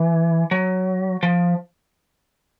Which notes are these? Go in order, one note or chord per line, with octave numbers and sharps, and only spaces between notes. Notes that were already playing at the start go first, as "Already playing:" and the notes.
Already playing: E3
F#3
F3